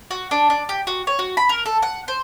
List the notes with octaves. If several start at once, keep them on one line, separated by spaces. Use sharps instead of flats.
F#4
D4
D4
G4
F#4
C#5
F#4
B5
A#4
A4
F#5
C5